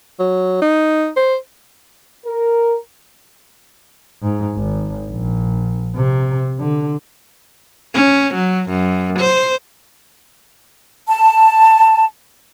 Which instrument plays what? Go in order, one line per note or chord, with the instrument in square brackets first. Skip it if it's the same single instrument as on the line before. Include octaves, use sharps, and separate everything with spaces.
[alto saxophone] F#3
D#4
C5
[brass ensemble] A#4
[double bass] G#2
G#1
A#1
C3
D3
[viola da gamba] C#4
F#3
F#2
C5
[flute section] A5